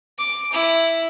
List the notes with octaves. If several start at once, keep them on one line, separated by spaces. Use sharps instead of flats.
D6
E4